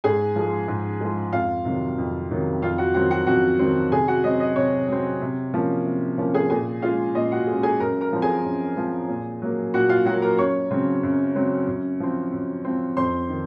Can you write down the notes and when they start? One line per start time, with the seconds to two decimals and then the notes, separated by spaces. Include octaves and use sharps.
0.04 G#2 G#4 G#5
0.36 F3 G#3
0.68 G#2
1.01 F3 G#3
1.33 F2 F4 F5
1.65 C3 D#3 F#3
1.98 F2
2.30 C3 D#3 F#3
2.62 F2 F4 F5
2.78 F#4 F#5
2.94 D#3 F#3 C4 F#4 F#5
3.11 F#4 F#5
3.27 F2 F#4 F#5
3.59 D#3 F#3 C4
3.92 C3 G#4 G#5
4.08 F#4 F#5
4.24 F#3 C4 D#5
4.40 D#5
4.56 C3 C#5
4.88 F#3 C4
5.21 C3
5.54 F3 A#3 C#4
5.86 C3
6.18 F3 A#3 C#4
6.34 G#4 G#5
6.50 A#2 G#4 G#5
6.82 G#3 C#4 F4 F5
7.15 A#2 D#5
7.32 F#4 F#5
7.47 G#3 C#4
7.63 G#4 G#5
7.80 F#2 A#4 A#5
8.01 A#4 A#5
8.13 F3 C4
8.22 G#4 G#5
8.45 F#2
8.77 F3 C4
9.08 A#2
9.42 F#3 A#3
9.74 A#2 F#4 F#5
9.89 F4 F5
10.05 F#3 A#3 F#4 F#5
10.22 A#4 A#5
10.38 F#2 C#5 C#6
10.71 C#3 F#3 C4
11.03 F#2
11.35 C#3 F#3 C4
11.67 F#2
12.00 F3 C4
12.32 F#2
12.65 F3 C4
12.97 F2 C5 C6
13.29 D#3